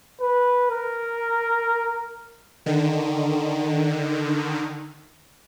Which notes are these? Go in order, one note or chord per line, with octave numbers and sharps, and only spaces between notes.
B4
A#4
D3 D#3